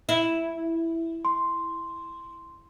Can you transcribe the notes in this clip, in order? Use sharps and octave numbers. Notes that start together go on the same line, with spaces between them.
E4
C6